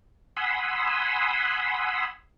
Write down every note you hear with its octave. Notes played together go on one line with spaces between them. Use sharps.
F#5 G#5 B5 C6 D#6 E6